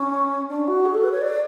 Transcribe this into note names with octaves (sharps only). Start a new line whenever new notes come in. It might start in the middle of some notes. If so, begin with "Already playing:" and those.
Already playing: C#4
D4
F#4
G#4
A4
B4
C#5
D5